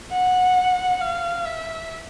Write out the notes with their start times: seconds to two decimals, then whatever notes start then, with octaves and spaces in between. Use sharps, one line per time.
0.12 F#5
1.01 F5
1.45 E5